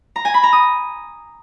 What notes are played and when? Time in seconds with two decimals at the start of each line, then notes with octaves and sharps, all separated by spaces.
0.16 A#5
0.25 G#5
0.34 B5
0.43 A#5
0.53 D#6